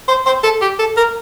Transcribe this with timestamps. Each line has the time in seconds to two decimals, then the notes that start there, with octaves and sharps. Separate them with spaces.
0.08 C5
0.26 C5
0.43 A4
0.62 G4
0.79 A4
0.97 A#4